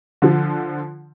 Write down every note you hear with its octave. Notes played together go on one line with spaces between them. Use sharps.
D3 F3